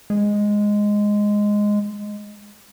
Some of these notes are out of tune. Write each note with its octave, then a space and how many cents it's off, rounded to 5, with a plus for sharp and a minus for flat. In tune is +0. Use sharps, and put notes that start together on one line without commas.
G#3 -5